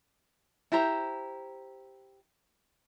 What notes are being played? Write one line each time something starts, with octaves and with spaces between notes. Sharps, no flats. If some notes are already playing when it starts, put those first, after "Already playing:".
E4 G4 C5 A#5